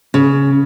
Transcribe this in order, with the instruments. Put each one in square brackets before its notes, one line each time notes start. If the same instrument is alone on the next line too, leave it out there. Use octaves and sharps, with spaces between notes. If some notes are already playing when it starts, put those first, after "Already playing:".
[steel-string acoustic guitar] C#3